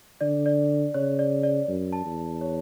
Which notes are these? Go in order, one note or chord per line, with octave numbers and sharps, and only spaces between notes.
D3 D5
D5
C#3 C#5
D5
D5
F#2
A5
E2
C#5